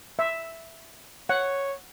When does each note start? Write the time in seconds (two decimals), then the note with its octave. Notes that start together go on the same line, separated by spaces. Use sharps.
0.19 E5
1.29 C#5 F#5